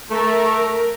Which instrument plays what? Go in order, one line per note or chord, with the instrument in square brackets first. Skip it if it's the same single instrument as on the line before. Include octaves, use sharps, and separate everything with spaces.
[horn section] A3 [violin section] A#4